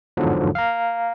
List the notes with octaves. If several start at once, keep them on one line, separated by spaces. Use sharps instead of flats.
G1 E2 G#2 D3 F3 F#3
F5 A#5